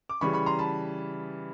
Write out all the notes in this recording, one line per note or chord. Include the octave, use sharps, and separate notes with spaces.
D6
C#3 E3 G3 B5 C#6
B5 C#6
A#5 C6
A5 B5